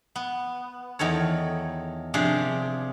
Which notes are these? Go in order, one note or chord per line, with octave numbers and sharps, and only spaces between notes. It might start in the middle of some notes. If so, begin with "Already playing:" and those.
B3
E2 D#3 A4 C#5
C3 F3 D4 G#4